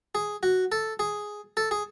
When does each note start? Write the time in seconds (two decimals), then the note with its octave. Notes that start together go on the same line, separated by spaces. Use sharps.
0.15 G#4
0.43 F#4
0.72 A4
0.99 G#4
1.57 A4
1.71 G#4